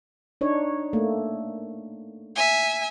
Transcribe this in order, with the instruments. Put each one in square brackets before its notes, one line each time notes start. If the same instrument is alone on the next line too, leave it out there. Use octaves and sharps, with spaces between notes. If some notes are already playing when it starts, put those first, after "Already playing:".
[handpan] D4 D#4 C#5
A3 A#3
[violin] E5 G#5